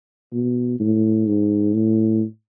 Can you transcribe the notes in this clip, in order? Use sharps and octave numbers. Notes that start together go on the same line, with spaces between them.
B2
A2
G#2
A2